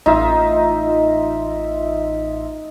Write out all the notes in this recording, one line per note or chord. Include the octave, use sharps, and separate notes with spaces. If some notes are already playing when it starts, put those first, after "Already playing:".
A1 D#4 F4 E5